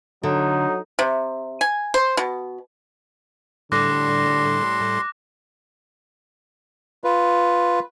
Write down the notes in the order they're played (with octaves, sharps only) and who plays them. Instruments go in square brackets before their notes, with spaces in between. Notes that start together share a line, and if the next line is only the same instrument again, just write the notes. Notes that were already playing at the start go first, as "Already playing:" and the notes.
[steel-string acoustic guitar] D3 [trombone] F#3 [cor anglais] D#4
[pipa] C3
G#5
C5
B2
[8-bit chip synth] A2 G3 A4 [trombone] D3 [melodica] C6 [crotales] D6 F#6 A#6
[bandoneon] F4 B4